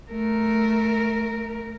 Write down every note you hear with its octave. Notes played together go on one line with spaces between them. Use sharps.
A3 A#4